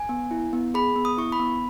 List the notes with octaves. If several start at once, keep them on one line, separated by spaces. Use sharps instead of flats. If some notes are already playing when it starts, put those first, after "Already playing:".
Already playing: G#5
B3
E4
B3
G#4 B5
B3
D#6
E4 C#6
B5
B3